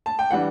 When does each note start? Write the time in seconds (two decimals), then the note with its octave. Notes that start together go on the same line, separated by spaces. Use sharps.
0.06 A5
0.19 G5
0.31 E3 G3 D4 F#5